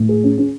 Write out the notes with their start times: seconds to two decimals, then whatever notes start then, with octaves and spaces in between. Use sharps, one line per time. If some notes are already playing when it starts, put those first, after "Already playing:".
Already playing: A2
0.09 G#4
0.24 C#4
0.38 C#4